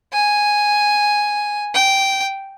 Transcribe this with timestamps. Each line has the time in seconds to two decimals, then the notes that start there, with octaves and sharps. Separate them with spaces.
0.13 G#5
1.74 G5